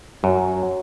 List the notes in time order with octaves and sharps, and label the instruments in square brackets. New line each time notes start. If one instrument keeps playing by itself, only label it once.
[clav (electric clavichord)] F#2 [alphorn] F#3